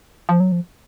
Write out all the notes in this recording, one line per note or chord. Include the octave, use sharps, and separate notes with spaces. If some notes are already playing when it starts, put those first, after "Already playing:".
F3
F#3
F3